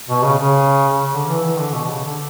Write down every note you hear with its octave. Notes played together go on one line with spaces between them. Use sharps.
B2
C#3
C#3
D3
E3
E3
D3
B2
C#3
D3